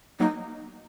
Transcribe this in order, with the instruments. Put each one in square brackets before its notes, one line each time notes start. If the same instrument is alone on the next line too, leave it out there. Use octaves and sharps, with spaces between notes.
[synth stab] F#3 A#3 [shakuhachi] D#4